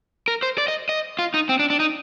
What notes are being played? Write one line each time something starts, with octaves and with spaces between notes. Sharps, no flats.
A#4
C5
D5
D#5
D#5
F4
D#4
C4
D4
D4
D#4